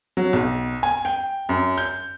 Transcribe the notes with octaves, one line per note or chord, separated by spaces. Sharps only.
F#3
B1
G#5
G5
F#2
G6